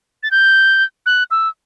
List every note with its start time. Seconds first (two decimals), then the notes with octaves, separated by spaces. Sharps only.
0.23 A6
0.31 G6
1.06 F#6
1.31 E6